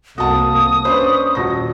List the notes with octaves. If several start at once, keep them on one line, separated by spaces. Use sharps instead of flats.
C2 A#3 F#4 A5 D#6
C#4 D4 B4 C5
D#1 F#4 A#6